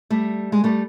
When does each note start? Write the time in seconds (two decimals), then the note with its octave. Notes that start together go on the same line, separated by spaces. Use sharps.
0.10 G3 A3
0.52 G#3
0.64 G3 A3